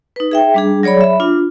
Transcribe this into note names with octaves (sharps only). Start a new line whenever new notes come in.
D#4 B4
G#4 E5 G5
G3 D4 G#4
F#3 G#4 C#5 D5 B5
E5 B5
D4 F4